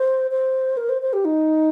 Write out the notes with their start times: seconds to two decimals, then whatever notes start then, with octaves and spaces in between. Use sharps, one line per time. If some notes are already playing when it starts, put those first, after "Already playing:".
Already playing: C5
0.31 C5
0.77 A#4
0.89 C5
1.02 C5
1.13 G4
1.25 D#4